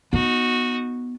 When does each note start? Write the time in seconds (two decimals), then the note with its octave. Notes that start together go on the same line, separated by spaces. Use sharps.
0.13 B3 D#4 F#4